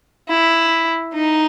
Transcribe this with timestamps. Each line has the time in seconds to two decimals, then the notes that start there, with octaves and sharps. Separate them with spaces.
0.28 E4
1.14 D#4